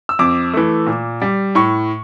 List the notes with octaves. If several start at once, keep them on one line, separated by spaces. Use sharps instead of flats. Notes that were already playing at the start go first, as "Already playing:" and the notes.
E6
F2 D6
E3 A3
A#2
G3
A2 C#6